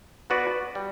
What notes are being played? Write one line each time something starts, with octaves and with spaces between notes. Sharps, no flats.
B3 F#4 B4 D5
G3